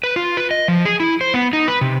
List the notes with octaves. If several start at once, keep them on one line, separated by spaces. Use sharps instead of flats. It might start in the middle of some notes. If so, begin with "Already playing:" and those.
B4
F4
B4
D#5
F3
G#4
E4
C5
B3
D#4
B4
C3